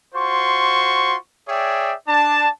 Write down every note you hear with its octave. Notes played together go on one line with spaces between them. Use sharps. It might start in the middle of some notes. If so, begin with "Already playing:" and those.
F4 F#4 C5 C6 C#6
G#4 C#5 D5 E5 G5
D4 A5